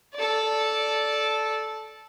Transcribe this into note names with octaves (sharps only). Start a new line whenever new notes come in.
A4 D5